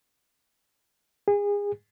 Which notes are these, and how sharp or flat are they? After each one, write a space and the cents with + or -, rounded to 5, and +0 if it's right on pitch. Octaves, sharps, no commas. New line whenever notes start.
G#4 -30